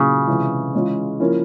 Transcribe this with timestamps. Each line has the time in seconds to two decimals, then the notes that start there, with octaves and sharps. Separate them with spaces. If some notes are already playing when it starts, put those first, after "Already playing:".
Already playing: A#2 C#3 F#3 B3 E4
0.27 C3 E3 G#3 C#4 F4
0.74 E3 G#3 C#4 F4
1.20 F3 A#3 C#4 E4